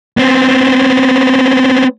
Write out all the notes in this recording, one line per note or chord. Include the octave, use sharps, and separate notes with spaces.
B3 C4